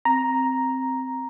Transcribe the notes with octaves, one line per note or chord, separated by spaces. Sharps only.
C4 A#5